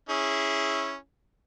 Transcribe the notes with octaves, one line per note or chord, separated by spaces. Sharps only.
C#4 E4 G#4